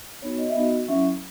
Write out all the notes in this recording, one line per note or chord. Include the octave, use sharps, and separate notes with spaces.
B3 D#4 F#4 C#5
D#5
E5
B3 D#4 F#4 D#5
F#3 C#4 E4 E5